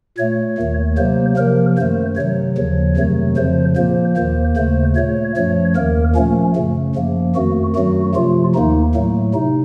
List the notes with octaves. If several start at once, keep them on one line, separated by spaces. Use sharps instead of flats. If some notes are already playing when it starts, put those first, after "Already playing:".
A#2 A3 C#5
D#2 D#3 A3
C3 F#3 A#3 C5
C3 F3 A#3 A#4
F#2 D#3 A3 C5
C3 D#3 F#3 C#5
D#2 C#3 F3
F2 C3 D#3 F#3 A3
F2 C#3 F3 C5
A#2 F3 A#3 C5
D#2 D#3 A#3 C5
D#2 C#3 A3 C5
A#2 A3 C#5
F#2 F3 A3 C#5
D#2 D#3 A#3 A#4
A#2 F3 A3 C#4
F#2 C#3 A3
F#2 F3 A#3
F2 D#3 A3 F#4
F#2 D#3 F#3 A3 F#4
C3 F3 A3 F4
D#2 D#3 A#3 D#4
A2 F#3 A3
C3 D#4